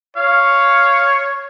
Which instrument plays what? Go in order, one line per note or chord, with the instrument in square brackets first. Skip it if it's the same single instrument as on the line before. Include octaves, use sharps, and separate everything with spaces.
[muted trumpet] C#5 [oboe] F5